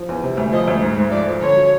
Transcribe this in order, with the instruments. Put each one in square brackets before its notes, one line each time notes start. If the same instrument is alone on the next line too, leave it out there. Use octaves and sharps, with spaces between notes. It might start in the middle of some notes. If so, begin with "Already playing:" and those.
Already playing: [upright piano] F3
E2
C3
D2
[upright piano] F3 [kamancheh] D#5
[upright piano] D2
G#2
G#2
[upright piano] F3 [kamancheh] D5
[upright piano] F3
[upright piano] D3 [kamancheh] C#5
[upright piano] F#3